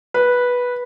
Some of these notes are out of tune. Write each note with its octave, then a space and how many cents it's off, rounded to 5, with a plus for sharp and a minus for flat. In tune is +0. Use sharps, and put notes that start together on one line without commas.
B4 -10